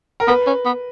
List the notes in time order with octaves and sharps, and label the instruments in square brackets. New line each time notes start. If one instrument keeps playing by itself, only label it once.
[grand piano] A#4
[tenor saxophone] B3 [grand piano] B4
[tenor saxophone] C#4
B3